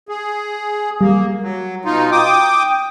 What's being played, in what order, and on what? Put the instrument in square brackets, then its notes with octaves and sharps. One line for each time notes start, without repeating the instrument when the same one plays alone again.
[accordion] G#4
[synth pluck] G3 [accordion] A#3
[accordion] F#3
B2 D#4 F4
G5 D6 D#6